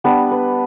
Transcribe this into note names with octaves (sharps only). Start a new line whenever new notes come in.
G3 B3 D4 B4
B4